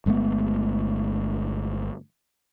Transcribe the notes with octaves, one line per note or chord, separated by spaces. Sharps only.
G1 G#3 A3 B3